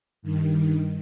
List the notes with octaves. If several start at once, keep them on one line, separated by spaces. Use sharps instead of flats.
G2 D#3